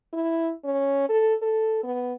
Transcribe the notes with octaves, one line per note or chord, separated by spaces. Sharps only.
E4
C#4
A4
A4
B3